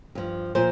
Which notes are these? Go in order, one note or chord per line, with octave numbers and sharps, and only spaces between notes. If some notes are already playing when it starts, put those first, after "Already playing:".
G2 F3
A#2 F3 C5